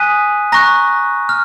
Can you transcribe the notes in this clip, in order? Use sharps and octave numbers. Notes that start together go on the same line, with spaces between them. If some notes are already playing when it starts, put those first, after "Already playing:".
Already playing: G#5 D#6 F#6 B6 D#7
A#5 C#6 F#6 A#6
F6